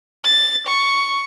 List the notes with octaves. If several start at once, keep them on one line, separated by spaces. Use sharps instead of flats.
A6
C#6